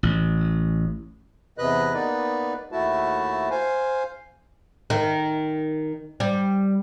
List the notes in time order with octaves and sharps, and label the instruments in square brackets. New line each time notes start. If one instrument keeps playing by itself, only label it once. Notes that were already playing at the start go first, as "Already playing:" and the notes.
[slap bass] A1
[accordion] E2 C3 B4 D#5 F#6
A#3 B3 D#4 B4 D5
D#2 A3 E4 F#4 A5
C5 F5 G#5
[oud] D#3
G3